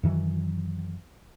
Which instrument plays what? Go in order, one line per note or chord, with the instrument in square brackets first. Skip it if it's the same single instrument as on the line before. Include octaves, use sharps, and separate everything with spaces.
[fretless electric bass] F#2 D#3 E3 F#3